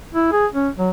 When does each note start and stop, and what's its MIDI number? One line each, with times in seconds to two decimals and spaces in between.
0.14 0.29 64
0.32 0.46 68
0.53 0.69 61
0.78 0.90 54